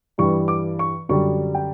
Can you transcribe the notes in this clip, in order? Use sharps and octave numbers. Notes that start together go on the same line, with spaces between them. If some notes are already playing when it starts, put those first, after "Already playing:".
G2 E3 G3 C#6
D6
C#6
F#2 D3 G3 C#6
G5